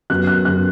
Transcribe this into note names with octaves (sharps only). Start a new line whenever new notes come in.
F#2 F#3 B3 F#6
F#6
F#2 F#3 B3 F#6